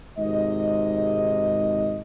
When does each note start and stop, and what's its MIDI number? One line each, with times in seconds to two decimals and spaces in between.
0.18 2.00 32
0.18 2.00 44
0.18 2.00 48
0.18 2.00 75